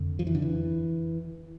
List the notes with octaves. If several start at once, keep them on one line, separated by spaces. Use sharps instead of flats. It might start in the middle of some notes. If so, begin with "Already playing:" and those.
Already playing: F2 D3
F3
E3
D3
E3